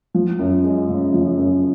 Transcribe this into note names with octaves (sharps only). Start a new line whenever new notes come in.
F3
F#2
G#3
C#3
F3
F#2